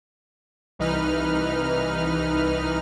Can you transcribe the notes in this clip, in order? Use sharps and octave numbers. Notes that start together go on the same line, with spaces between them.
C2 E3 D#4 B4 F6